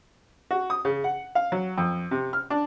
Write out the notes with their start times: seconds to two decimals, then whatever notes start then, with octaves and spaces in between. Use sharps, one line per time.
0.51 F#4
0.70 D#6
0.85 C#3
1.04 F#5
1.35 F5
1.52 F#3
1.78 F2
2.11 C3
2.33 F6
2.50 D4